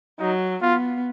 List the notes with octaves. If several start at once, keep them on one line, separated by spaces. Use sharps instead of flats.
F#3 D#4
B3 F4